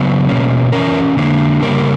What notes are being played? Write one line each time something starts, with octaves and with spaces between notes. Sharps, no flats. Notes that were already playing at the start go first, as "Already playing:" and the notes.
Already playing: C#3 F#3 B3
B2 A#3 C#4
E3 G3 C#4 A#4
D3 A#3 D4
C#3 G3 A#3 A#4